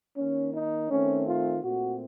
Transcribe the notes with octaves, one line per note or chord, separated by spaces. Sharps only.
D#3 A#3 C#4
D#4
D#3 A3 C4 C#4
F4
A#2 A3 C4 F#4